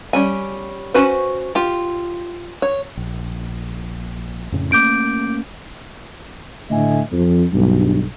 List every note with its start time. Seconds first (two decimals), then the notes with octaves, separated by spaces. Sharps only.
0.13 G3 C#4 G#5
0.94 C#4 F#4 B4 C5
1.55 F4 G4
2.62 C#5
2.97 A#1
4.52 F2 A2 C#3
4.72 A3 A#3 C#4 D6 G6 D7
6.71 A2 D3 A3 D#5 E5 G#5
7.12 F2
7.53 B1 G2